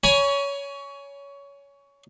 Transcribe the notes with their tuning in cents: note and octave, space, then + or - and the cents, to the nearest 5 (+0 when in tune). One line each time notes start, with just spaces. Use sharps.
C#5 +20 G#5 +10 B5 -35